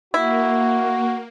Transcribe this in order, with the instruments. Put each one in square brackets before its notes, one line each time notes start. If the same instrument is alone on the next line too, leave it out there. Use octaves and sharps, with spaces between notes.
[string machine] A#3 [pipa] E4 [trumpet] F#4